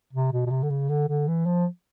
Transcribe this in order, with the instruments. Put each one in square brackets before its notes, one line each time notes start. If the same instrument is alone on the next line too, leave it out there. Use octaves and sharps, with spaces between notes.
[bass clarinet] C3
B2
B2
C3
D3
C#3
D3
D3
E3
F3